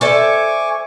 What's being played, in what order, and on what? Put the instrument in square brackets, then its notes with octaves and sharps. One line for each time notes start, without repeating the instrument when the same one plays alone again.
[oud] A4 C5 D5 [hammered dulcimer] E5 A#5 [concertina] G#5 C#6 D6